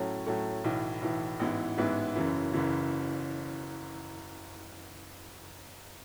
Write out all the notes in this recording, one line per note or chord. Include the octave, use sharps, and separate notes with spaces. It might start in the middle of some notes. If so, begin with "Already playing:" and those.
Already playing: A2 F#3 A3 C#4
A2 F#3 A3 C#4
B1 A2 E3
B1 A2 E3
A1 G#2 E3 B3 E4
A1 G#2 E3 B3 E4
F#1 F#2 C#3 E3
F#1 F#2 C#3 E3